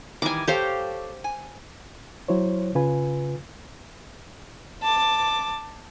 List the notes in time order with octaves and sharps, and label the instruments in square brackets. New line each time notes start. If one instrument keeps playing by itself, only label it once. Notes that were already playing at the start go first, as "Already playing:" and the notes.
[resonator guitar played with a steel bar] D#3 E3 G3 [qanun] G#5 D6
[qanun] G4 C5 F5 [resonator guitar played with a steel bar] A4 C#5
[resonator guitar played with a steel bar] G#5
[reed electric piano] F#3 E4 C5 C#5
C#3 F4 B4 G#5
[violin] A5 D6